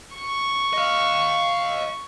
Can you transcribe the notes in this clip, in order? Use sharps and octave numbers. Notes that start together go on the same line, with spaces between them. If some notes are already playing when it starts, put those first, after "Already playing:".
C#6
D#5 F5